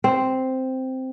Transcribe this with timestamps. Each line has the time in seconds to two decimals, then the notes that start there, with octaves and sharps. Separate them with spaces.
0.04 C4